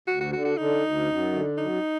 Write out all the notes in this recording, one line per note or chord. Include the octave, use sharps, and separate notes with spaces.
D2 F#4
F#4
D3 F#4
F#4
D3 D#4
D2
F#2
D3
F#2 D#4